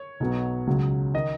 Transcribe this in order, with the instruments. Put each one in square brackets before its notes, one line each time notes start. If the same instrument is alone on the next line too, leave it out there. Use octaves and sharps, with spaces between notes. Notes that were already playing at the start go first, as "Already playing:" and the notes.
Already playing: [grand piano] C#5
B1 B2 F#3 B3
C#2 C#3 F#3
D#3 D#5